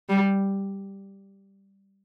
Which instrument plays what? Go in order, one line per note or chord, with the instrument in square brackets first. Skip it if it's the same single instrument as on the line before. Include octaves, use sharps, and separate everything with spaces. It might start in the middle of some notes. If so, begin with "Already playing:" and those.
[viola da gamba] G3